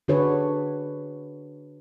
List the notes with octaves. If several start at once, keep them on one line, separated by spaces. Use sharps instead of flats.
D3 D4 F#4 G#4 B4 C#5